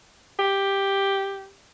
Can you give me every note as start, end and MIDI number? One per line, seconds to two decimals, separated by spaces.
0.39 1.51 67